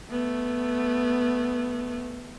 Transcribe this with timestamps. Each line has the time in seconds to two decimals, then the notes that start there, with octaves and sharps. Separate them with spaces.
0.10 A3 B3